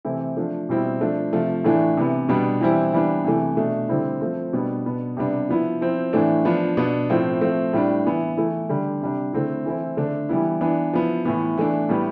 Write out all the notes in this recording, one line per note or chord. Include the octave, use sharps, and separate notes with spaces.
C3 E3 A3 C4 E4
F3 A3 D4
B2 G3 C4 E4
F3 A3 D4
C3 F3 A3
A2 E3 A3 D4
C3 E3 B3
B2 G3 B3 D4
E3 G3 C4 E4
E3 G3 B3 D4
C3 E3 A3
B2 A3 D4
D3 G3 C4 E4
F3 A3 C4
B2 G3 B3 D4
B2 B3 D4
C3 G3 B3 D4
F3 B3 E4
F3 C4 E4
A2 E3 A3 D4
F3 B3 D4
B2 B3 D4
A2 F3 C4 E4
F3 A3 C4
A2 G3 D4
E3 B3 E4
E3 A3 E4
D3 G3 D4
C3 G3 D4
D3 A3 C4 E4
E3 A3 C4 E4
D3 A3 D4
E3 G3 B3 E4
E3 B3 D4
F3 B3 E4
A2 E3 B3
E3 A3 D4
A2 G3 B3